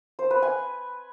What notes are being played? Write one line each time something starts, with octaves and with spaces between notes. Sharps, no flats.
C5
B4
G#5